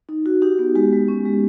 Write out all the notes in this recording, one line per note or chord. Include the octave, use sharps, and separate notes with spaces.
D#4
F#4
D#4 G4
B3
G#3 G4
G#3
C#4
G#3